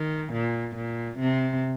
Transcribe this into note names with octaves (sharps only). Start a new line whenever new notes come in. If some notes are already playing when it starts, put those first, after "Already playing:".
Already playing: D#3
A#2
A#2
C3